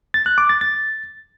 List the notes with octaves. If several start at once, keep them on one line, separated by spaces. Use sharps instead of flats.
A6
F#6
D6
A6
A6